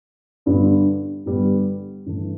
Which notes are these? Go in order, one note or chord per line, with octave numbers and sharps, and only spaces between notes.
G2 D3 G3 B3
G2 D3 G3 B3
G2 E3 A3 D4